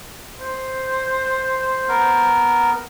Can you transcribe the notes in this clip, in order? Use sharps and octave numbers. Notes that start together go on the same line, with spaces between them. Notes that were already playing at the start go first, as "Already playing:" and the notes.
C5
B3 A#4